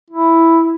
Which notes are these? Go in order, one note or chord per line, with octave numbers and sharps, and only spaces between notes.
E4